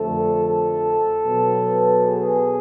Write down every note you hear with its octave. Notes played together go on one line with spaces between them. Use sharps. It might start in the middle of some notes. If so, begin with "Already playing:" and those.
Already playing: F2 D3 F3 A3 A4
A4
B2 F#3 B3
G#4